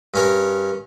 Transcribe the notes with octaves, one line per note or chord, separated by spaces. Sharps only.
G2 C#4 A#4